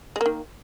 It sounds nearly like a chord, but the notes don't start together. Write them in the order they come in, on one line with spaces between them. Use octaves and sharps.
G#3 A#3 D#3